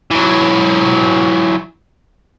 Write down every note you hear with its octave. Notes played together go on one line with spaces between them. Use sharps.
E3 F#3